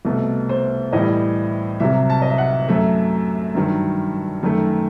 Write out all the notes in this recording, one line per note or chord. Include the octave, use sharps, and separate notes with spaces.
C2 B2 A3
C5
A2 E3 G3 D#5
C2 C3 F#3 E5
A5
D#5
E5
F#5
F#2 F#3 A3 E5
G2 D#3 F#3
F#2 D#3 A3